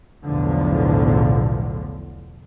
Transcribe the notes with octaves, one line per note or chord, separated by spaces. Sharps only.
B1 E2 A2 D3 F3